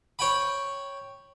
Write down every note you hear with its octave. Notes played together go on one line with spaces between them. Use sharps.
C#5 G5 B5